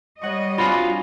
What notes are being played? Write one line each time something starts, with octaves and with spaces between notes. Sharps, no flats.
G3 C#5 D#5 F#5 C#6
C4 D4 F4 F#4 F5 G#5 B5